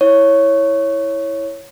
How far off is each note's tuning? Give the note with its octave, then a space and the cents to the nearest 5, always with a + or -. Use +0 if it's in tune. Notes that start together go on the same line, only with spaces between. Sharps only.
E4 +0 C#5 +0